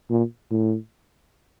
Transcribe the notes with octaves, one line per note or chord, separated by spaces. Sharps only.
A#2
A2